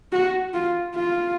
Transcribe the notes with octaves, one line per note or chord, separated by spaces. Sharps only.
F#4
F4
F4